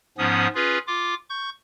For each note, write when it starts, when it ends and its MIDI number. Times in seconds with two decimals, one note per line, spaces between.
0.18 0.47 44
0.18 0.47 53
0.18 0.47 59
0.18 0.47 61
0.18 0.47 87
0.55 0.78 61
0.55 0.78 65
0.55 0.78 68
0.55 0.78 71
0.87 1.14 65
0.87 1.14 86
1.30 1.50 85
1.30 1.50 91